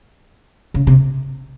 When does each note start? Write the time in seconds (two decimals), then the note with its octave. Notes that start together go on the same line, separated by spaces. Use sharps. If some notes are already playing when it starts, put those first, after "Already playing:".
0.74 C#3
0.87 C3